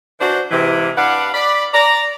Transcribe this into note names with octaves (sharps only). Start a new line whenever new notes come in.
E3 D4 F#4 C5
G#2 C3 E3
D4 B4 D5 F5 F#5
D5 B5
D5 A#5